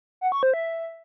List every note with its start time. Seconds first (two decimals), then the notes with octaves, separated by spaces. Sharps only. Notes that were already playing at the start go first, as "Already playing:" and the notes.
0.21 F#5
0.32 C#6
0.43 C5
0.54 E5